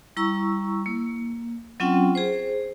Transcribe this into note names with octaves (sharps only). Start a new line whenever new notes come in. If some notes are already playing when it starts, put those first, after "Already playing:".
G3 E4 A#5 C#6 E6
A#3
F#3 C4 C#4 F4 F#5 G5
G#4 C5